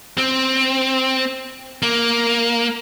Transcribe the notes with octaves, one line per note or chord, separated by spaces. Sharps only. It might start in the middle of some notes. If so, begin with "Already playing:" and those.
C4
A#3